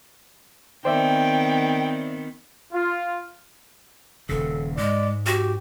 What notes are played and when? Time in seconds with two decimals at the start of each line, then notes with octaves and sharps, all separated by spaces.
0.85 D#3 B3 C4 C5 D5 E5 G5
2.73 F4
4.29 D#1 C#3 A4
4.77 G#2 G#3 D5
5.26 F#4 G4